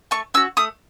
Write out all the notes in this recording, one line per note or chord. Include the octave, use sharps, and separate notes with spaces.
A3 C#6
C#4 F#4 E6
A3 D#6